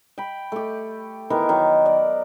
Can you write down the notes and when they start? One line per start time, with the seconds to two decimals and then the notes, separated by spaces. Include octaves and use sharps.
0.18 G5 B5
0.52 A3 G4
1.30 D#3 E3 B3 A#4
1.49 D#3 F#3
1.86 D5